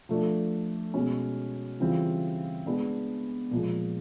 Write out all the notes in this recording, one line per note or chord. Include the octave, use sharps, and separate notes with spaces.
F3 A3 D4
B2 G#3 C#4
C#3 E3 G3 C4 F4
G#3 B3 D4
A#2 F3 G#3